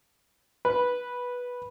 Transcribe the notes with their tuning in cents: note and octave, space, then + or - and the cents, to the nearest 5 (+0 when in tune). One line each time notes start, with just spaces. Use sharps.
B4 -10